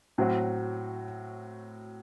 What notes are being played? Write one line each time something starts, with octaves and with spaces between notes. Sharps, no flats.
A2 F#3 C4 F#4